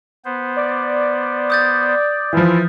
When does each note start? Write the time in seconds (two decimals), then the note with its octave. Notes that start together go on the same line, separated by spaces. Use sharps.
0.25 B3 C5
0.56 D5
1.50 D#6 G6 A6
2.33 E3 F3 E4 F4